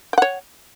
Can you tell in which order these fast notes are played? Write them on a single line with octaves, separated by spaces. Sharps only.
G5 F#5 C#5